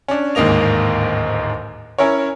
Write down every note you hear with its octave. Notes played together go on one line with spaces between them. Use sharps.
C#4 D4
D1 D#2 G#2 A#3 D#5 F7
C#4 E4 A#4 C#5